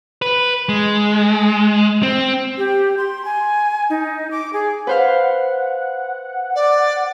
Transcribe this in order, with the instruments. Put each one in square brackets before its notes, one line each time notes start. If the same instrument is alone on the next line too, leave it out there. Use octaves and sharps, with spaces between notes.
[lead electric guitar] B4
G#3
C4
[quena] G4
C6
G#5
D#4
D6
G#4
[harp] B4 C5 F5 [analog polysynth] F#5
[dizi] D5